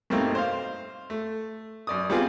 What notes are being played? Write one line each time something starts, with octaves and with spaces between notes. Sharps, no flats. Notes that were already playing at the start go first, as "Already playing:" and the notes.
G2 B2 A3 A#3 C4 D#4
C5 F5
A3
F#2 D5 D#6
G3 B3 C4 F4 G#4